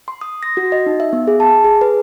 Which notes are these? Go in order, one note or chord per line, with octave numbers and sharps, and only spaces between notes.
C6
D#6
A#6
F#4
D#5
D#4
E5
B3
G#4
A5
G#4
B4